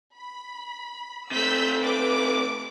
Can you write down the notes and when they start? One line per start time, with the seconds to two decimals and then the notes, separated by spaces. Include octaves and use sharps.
0.15 B5
1.31 C3 A3 E6 G6 B6
1.81 B4 D6